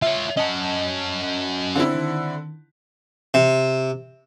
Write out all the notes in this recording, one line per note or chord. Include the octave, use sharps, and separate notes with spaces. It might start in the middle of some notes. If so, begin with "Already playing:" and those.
F4 C#5 E5
C#4 F#4 D#5 A5
D3 C4 E4
D#3
C3